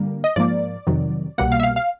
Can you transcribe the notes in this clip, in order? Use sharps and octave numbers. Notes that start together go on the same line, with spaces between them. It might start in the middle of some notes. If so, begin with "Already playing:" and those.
Already playing: G2 D3 G3 A#3
D#5
G#2 F3 A#3 D5
F2 C3 D#3 F#3
C2 B2 G3 A#3 F#5
F5
E5
F5
F5